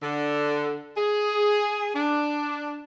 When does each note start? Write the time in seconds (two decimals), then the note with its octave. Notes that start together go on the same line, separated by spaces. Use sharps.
0.01 D3
0.97 G#4
1.95 D4